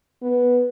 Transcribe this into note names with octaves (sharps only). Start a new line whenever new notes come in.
B3